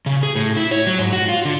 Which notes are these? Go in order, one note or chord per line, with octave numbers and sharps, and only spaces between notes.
C#3
G#4
A2
E4
C#5
F#3
G#2
F#4
F4
D3